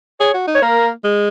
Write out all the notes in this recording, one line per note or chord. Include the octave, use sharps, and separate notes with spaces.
G#4 C#5
F#4
D#4
C#5
A#3 A#4
G#3